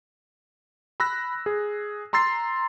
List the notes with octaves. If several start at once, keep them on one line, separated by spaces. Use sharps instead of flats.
B5 E6 F#6 A#6
G#4
A#5 C6 E6 A6 C7